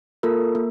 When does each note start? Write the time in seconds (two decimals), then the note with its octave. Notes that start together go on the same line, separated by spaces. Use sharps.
0.23 A#3 F4 A4 A#4
0.55 A#3